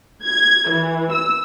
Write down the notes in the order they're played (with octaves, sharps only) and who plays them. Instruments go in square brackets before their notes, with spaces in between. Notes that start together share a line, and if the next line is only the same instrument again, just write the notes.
[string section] G#6
E3
E6